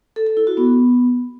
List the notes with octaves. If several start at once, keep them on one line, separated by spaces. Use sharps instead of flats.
A4
A4
E4
F#4
B3